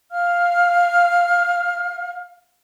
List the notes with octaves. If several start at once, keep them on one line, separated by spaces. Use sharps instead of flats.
F5 F6